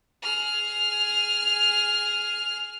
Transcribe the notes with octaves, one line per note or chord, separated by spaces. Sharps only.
G#4 F6